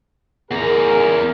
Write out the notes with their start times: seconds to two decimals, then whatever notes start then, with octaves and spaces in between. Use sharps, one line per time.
0.51 E2 G#4 A#4 A#5